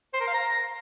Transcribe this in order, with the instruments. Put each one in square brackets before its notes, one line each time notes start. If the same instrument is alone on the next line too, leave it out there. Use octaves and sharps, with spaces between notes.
[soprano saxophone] C5
A#4
F5
A#5